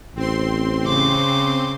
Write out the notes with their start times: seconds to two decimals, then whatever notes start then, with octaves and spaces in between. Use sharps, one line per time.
0.16 A1 C4 C6
0.86 C#3 D6